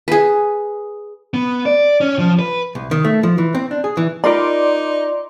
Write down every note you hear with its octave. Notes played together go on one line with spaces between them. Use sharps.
G#4 B4
B3
D5
C#4
F3
B4
C2
D#3
A3
F3
E3
C4
D4
G#4
E3
D#4 F4 A#4 D5 B5 C6 D6